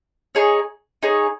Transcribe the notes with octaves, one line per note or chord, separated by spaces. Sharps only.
D#4 G#4 C#5
D#4 G#4 C#5